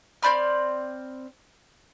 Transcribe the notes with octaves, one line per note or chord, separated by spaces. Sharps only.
C4 D5 B5 F6